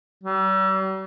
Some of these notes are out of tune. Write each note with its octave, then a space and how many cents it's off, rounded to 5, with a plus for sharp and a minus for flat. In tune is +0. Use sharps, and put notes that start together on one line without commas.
G3 -45